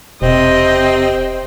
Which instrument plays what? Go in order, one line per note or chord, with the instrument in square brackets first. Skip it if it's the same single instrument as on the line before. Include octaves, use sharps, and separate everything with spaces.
[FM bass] E1 [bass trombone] C3 [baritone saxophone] C4 [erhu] D#5